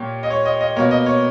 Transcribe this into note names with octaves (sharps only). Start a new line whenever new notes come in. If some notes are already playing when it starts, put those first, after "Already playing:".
Already playing: A#2 A#3 G4 C#5
D#5
C#5
D#5
D#5
B2 A#3 C#5
D#5
C#5